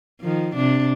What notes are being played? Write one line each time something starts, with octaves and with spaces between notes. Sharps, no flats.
D#3 F3
C3 D4